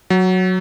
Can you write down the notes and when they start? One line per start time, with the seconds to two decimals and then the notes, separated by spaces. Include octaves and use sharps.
0.10 F#3